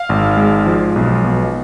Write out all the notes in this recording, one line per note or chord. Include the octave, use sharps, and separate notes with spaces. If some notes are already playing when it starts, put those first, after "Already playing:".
Already playing: F5
G#1
G#3
F3
B1
B2